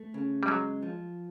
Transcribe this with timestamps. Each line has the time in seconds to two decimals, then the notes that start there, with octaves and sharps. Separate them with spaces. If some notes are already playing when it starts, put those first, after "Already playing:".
Already playing: A3
0.14 C#3
0.43 G3
0.47 F#3 G#3
0.83 F3